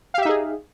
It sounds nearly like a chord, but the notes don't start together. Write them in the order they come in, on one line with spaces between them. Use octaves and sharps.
F5 G4 E5 D#4 G#4